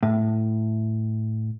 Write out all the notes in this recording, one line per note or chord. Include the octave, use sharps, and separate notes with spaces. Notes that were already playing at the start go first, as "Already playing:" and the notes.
A2